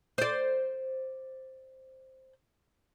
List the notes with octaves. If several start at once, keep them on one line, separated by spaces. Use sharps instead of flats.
C5 D5